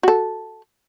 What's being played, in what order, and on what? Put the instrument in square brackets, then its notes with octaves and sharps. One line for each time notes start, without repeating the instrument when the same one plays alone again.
[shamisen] F#4 A4